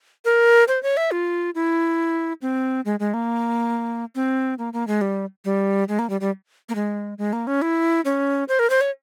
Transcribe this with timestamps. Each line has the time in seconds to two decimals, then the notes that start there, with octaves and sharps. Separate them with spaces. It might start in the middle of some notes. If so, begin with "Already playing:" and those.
0.25 A#4
0.68 C5
0.83 C#5
0.97 E5
1.11 F4
1.55 E4
2.42 C4
2.85 G#3
3.00 G#3
3.14 A#3
4.15 C4
4.59 A#3
4.73 A#3
4.87 G#3
5.01 G3
5.45 G3
5.89 G#3
5.99 A#3
6.10 G3
6.21 G3
6.69 A#3
6.75 G#3
7.18 G#3
7.33 A#3
7.47 C#4
7.62 E4
8.05 C#4
8.48 C5
8.59 A#4
8.70 C5
8.81 C#5